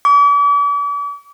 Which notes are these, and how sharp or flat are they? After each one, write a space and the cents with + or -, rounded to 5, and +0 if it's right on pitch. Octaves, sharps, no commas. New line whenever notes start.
D6 -40